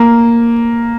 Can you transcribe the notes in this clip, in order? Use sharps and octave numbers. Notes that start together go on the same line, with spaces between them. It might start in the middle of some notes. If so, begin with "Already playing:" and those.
Already playing: A#3